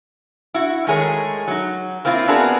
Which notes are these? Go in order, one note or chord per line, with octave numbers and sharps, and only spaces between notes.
E4 F#4
D#3 G#3 A3 G#4 A#4 C#5
F#3 D#4
A#3 C4 E4 F4
B3 C4 D4 F#4 G#4 A#4